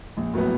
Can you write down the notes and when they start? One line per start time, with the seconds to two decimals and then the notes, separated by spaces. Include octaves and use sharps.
0.17 A#1
0.34 A2 F#3 B3